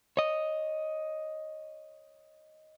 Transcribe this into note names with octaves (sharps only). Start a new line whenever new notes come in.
C#5 D#5